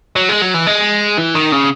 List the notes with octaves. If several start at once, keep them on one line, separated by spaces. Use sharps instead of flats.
F#3
G#3
F#3
E3
G#3
E3
D#3
C#3